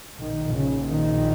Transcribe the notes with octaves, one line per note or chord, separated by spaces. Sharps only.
A#1 A#2 D#3
C#3
D#3